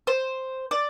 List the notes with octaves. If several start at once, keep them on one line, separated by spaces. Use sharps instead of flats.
C5
D5